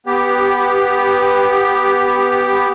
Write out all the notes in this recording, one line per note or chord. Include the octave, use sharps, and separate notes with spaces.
B3 G4